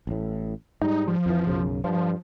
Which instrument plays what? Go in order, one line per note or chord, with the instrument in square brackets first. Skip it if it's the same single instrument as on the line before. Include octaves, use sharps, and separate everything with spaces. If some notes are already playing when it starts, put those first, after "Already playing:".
[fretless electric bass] A1 A2
[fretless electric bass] G#2 G3 [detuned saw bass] D#4
[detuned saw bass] F3
[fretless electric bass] F2 E3
B1 F#2 C#3
[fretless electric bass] G2 [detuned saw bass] F3